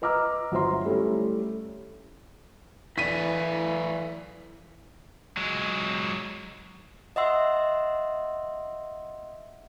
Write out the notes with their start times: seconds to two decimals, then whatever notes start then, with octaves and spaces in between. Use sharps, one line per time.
0.02 B4 D#5 A#5 D6 E6 F6
0.52 G1 F#3 C5 E5 A#5 C6
0.86 G3 A3 C#4 E4
2.98 E3 E4 A4 D5 B6 D#7
5.37 F#3 G#3
7.16 D#5 E5 F#5 C6 E6